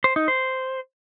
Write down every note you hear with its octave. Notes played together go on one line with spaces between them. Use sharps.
C5
D#4
C5